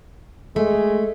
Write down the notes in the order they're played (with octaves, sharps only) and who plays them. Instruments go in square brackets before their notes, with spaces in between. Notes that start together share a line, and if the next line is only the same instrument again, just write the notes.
[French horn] G#3 [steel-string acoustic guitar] A3